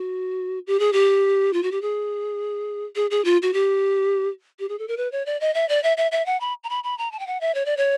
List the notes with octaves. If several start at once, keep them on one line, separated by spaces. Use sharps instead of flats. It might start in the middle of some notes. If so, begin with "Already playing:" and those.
Already playing: F#4
G4
G#4
G4
F4
F#4
G4
G#4
G#4
G#4
F4
F#4
G4
G4
G#4
A4
A#4
B4
C#5
D5
D#5
E5
D5
E5
E5
E5
F#5
B5
A#5
B5
B5
A#5
A5
G5
F#5
E5
C#5
D5
C#5